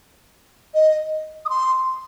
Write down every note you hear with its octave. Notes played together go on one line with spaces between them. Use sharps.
D#5
D#6
C6